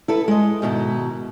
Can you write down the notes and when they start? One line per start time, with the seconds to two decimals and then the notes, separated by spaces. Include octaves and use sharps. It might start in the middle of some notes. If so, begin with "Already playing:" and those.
0.08 E4 A4 B4
0.28 G#3 D#5
0.62 G#2 B2 D#3 E4